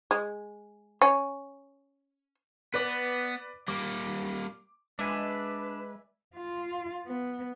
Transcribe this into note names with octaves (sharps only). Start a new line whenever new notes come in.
G#3
C#4
B3 B4 D5 D6
G3 A#3 D6
G#3 D4 B4 D5 E5 G#5
F4
B3